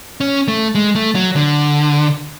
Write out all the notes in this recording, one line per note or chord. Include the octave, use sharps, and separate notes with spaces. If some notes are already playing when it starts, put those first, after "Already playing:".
C#4
A3
G#3
A3
F#3
D3